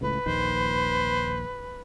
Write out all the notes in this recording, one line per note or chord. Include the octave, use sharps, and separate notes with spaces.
C#2 A2 C#3 B4
A#1 D#2 D#3 C5